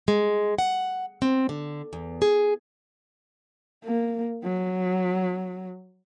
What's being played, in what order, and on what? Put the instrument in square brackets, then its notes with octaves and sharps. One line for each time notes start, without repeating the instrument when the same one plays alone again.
[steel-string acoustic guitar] G#3
F#5
C4
D3
E2
G#4
[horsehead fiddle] A#3
F#3